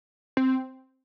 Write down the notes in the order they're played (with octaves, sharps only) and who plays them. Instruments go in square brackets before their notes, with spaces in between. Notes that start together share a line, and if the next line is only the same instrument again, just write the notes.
[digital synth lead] C4